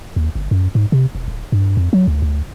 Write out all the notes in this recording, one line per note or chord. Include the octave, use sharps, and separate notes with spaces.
D#2
G1
F#2
G#2
C3
E1
D1
G2
F2
F#3
D2
D2